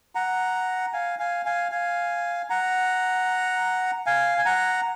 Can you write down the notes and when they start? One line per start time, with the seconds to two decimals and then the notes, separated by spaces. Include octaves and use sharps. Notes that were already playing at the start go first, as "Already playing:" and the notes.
0.15 F#5 A#5
0.93 F5 G#5
1.19 F5 G#5
1.45 F5 G#5
1.72 F5 G#5
2.50 F#5 A#5
4.06 F5 G#5
4.38 G#5
4.46 F#5 A#5